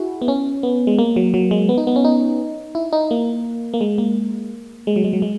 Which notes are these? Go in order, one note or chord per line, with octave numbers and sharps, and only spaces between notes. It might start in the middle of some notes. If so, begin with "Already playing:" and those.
Already playing: E4 F#4 G#4
B3
C#4
B3
G#3
A#3
F#3
F#3
G#3
B3
D#4
B3
C#4
D#4
E4
D#4
A#3
A#3
G#3
A#3
G#3
F#3
G#3
F#3
G#3